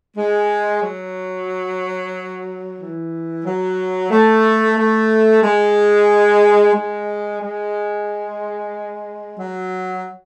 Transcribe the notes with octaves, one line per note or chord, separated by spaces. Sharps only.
G#3
F#3
E3
F#3
A3
A3
G#3
G#3
G#3
F#3